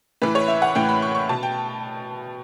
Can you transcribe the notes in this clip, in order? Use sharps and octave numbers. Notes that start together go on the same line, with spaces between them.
A2 E3 B4
C#5
E5
F#5
A2 E3 G5
B5
C#6
C#6
B2 A5
G5